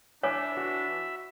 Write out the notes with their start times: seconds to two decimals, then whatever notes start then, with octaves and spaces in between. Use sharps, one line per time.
0.23 E3 D4 C#5 E5 G#5 B5 D6
0.57 F#4